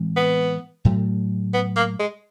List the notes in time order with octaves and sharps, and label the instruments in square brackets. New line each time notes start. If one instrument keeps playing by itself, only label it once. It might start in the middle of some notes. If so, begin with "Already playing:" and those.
Already playing: [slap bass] A2 E3 G#3 C4
[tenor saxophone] B3
[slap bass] A2 F#3 A3
[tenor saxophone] B3
A#3
G#3